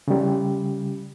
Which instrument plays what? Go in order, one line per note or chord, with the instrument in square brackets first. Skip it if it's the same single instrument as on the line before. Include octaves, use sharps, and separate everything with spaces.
[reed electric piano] C#3 G3